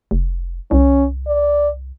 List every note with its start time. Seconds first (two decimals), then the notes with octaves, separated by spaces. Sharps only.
0.11 F1
0.71 C2 C#4
1.27 D5